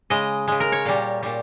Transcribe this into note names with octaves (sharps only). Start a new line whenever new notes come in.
C#3 G#3 D#5
C#3 G#3
A#4
C#5
A#2 G3
A#2 G3